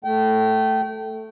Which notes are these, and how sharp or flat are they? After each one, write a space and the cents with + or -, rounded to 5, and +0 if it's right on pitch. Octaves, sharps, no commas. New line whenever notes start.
A3 +0 G5 -30